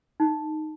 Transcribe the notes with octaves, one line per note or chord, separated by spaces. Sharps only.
D#4